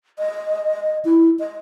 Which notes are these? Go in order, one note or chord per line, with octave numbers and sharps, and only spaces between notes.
D#5
E4
D#5